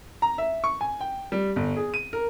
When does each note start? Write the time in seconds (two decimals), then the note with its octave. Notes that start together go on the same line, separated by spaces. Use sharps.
0.22 A#5
0.38 E5
0.64 C#6
0.81 G#5
1.01 G5
1.32 G3
1.56 G1
1.76 G#4
1.94 D#7
2.13 A#4